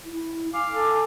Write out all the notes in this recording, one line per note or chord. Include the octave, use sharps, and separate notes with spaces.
E4
F5 G#5 D6
A4